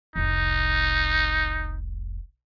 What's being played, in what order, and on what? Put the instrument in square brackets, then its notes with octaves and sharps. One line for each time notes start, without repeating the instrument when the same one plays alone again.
[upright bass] F1 C2 [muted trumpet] D#4